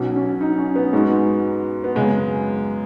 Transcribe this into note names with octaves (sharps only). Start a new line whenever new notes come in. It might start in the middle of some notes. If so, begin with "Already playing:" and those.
Already playing: B1 B2 F#3 C#4
C#4
D#4
C#4
B3
G#2 G#3 D#4 F#4
B3
F#2 C#3 G#3 B3